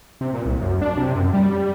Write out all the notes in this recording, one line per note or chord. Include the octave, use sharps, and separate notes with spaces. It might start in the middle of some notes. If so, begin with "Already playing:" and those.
C3
A#2
C2
F#2
D4
C3
F#2
G3
G3